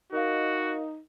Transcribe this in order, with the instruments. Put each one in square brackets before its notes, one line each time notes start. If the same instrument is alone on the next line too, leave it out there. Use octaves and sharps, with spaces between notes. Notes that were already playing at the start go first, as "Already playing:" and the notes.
[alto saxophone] D#4 [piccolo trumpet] F#4 [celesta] A#4 D#5 F5